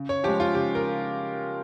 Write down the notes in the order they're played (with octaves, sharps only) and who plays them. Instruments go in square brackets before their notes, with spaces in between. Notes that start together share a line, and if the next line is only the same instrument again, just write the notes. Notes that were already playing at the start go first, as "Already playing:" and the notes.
Already playing: [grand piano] C#3
C#5
F3 G4
G#3
F4
C#3 G4
A#4